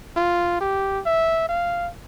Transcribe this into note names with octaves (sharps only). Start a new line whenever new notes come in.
F4
G4
E5
F5